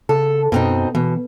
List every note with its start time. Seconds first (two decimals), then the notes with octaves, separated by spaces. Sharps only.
0.09 C#3 A4
0.52 F#2 B2 C4 D#4
0.95 B2 E3